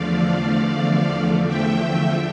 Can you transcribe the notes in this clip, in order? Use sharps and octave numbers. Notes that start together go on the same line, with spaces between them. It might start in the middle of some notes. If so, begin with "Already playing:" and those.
Already playing: E2 D3 F3 A3 D5 F5
E5 G5